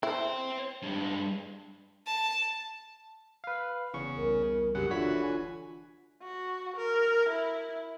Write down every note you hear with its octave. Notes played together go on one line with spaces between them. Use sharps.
E4 C5 G5
G2 G#3
A5
B4 F5
F1 E2 C#3 C#6
C2 A#4
F#2 C#3 G4 F#5
F1 D3 E3 F4 F#4 C#5 B6
G#5
F#4
A#4
E4